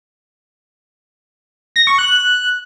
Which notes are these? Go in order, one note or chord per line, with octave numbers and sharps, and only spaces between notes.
A#6
C#6
F#6